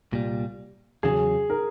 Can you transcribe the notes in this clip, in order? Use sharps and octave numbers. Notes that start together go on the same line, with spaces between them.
C2 A#2 G3
E2 C#3 F#3 G#4
A#4